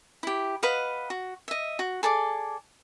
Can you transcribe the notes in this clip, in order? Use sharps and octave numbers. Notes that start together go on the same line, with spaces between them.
E4 G4
B4 D#5 F5 F#5
F#4
D#5 E5
F#4
G#4 A4 D5 D6